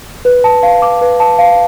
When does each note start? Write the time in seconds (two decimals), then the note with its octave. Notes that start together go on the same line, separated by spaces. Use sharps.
0.25 B4
0.44 A5
0.63 F5
0.82 D6
1.01 B4
1.20 A5
1.39 F5